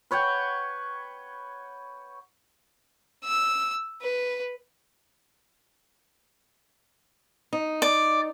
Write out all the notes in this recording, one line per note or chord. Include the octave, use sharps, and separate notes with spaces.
B4 C#5 F#5 G5
E6
B4
D#4
D5